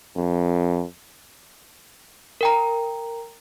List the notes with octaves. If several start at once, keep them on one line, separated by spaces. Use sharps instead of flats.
F2
A#4 G5 A#5